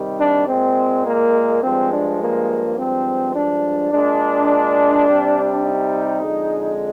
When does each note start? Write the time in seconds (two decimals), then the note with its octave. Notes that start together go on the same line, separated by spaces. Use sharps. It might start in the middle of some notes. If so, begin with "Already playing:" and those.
Already playing: C3 D#3 G3
0.20 D4
0.48 A#2 G#3 C4
1.06 A#3
1.63 G2 F3 G#3 C4
1.92 D4
2.20 A#3
2.77 G2 F3 G#3 C4
3.36 D4
3.92 A#2 G#3 D4
5.07 C3 G3
5.64 D#4
6.22 F2 D3 G#3